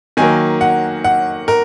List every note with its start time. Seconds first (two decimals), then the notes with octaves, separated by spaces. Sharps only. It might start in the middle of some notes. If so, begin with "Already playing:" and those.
0.17 D#3 F#3 A#3 G#5
0.61 F#5
1.04 F#5
1.48 A#4